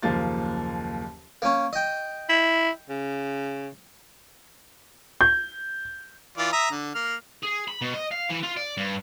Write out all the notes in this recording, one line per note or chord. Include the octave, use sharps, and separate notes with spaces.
F#1 D#2 F3 A#3 A6
A#3 C#4
D#5 G5
E4
C#3
G6
E3 F4 D5
E5 A#5 D#6
D3
A#3 F6
G#4
B5
B2
D#5
F5
E3
F4
D5
G2